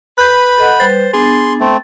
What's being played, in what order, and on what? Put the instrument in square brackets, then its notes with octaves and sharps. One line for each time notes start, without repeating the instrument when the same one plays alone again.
[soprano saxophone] B4 [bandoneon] B5 [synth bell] F#6 G6
[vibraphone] A4 D#5 F#5
[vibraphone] G3 B4 [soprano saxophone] C5 [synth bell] A6
[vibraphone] B3 D4 [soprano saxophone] G#4 [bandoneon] C6
[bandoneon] A3 C4